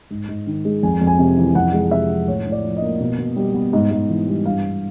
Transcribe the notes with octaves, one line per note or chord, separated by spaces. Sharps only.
G#2
G#2
D#3
G#3
F2 G#5
F2
G#5
C3
E3
F2 F#5
G#3
C3 E5
F3
A2 C#5
A2
D5
F3
D#5
A#3
B2
B2
G3
B3
G#2
G#2
E3
G3
G2 F5
G2